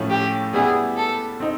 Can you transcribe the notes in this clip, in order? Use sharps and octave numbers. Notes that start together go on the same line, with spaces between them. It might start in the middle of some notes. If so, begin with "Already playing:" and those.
Already playing: A2 F3 A3 C#4 E4
G4
G3 B3 E4 G4 G#4
A4
C4 D#4